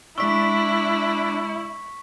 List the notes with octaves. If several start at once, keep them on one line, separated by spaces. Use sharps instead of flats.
G#3 D4 E4 D5 C#6 E6 B6